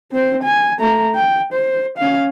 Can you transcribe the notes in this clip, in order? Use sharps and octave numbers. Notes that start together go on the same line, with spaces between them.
C4 C5
G#5
A3 A#5
G5
C5
C#4 F5